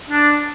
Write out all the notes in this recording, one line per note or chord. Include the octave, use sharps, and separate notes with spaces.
D4